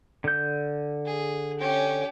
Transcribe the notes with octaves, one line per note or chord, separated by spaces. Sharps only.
D3 G6
G#4
C#4 G4